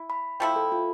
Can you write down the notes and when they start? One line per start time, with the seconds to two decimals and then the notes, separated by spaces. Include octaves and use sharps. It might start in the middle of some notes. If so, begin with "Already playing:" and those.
Already playing: E4
0.10 B5
0.40 F3 A3 E4 G5
0.56 A4
0.72 F4